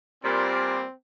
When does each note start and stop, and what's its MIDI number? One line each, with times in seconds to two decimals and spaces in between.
0.23 0.79 46
0.23 0.79 55
0.23 0.94 60